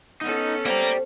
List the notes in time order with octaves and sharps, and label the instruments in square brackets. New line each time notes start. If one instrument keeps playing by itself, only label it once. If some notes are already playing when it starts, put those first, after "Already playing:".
[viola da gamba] B3 C#4 A4 [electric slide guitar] D#4
[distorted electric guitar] A#3 A#5 [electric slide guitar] G4 D5 [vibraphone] C5